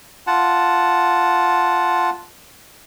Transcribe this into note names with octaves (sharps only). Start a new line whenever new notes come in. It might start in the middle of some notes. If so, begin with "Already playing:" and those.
F4 F#5 A5